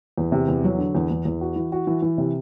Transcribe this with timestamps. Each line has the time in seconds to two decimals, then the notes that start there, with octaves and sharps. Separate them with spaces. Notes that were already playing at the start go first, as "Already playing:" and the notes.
0.18 E2
0.32 C3
0.48 E2
0.64 F#3
0.78 D3
0.95 E2
1.10 E2
1.25 E2
1.41 F#4
1.56 E3
1.72 F#4
1.87 E3
2.02 E3
2.18 C3